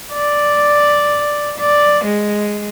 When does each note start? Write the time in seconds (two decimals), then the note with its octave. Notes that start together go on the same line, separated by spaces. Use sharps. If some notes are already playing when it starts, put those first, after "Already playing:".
0.13 D5
1.59 D5
2.05 G#3